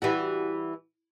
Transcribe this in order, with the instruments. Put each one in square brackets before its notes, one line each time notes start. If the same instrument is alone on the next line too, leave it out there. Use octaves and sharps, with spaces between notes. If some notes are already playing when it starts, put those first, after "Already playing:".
[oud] E3 G3 F#4